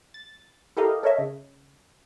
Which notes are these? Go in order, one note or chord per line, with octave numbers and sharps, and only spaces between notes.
A6
E4 G4 A4 A#4 D#5 F5
A4 A#4 C#5 D#5 E5
C#3